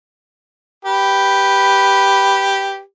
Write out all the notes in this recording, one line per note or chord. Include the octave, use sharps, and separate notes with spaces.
G4 B4